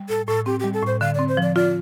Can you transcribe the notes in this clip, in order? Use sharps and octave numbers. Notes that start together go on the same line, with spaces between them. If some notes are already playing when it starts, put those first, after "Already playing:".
Already playing: G3
A2 A4
A2 A4
C4 G4
G3 G4
A4
A2 C5
D3 F5
C4 D5
C5
F3
D5
F4 D5